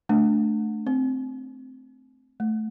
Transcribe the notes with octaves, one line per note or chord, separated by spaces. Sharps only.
A3 D4
C4
A3